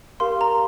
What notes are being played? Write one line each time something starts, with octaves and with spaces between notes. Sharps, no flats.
G4 A#4 F5 C6
A#5